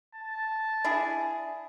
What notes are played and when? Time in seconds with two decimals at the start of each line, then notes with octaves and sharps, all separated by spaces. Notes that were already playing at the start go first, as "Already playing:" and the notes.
0.15 A5
0.84 D4 E4 G#4